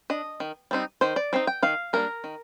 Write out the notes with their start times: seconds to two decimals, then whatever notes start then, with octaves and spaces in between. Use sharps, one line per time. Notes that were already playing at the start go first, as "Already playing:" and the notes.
0.10 D4 D#5
0.40 D#3
0.71 G3 C4 D#4
1.01 D#3 C5
1.16 D5
1.33 G3 C4 D#4
1.47 G5
1.63 D#3 F5
1.93 G3 A#3 D4 A#4
2.24 D#3